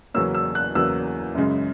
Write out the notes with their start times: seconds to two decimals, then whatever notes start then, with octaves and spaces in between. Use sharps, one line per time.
0.14 E2 C#3 F#3 A#3 C#4 E6
0.35 E6
0.55 F#6
0.75 E2 C#3 F#3 A#3 E6
1.35 F#2 C#3 G#3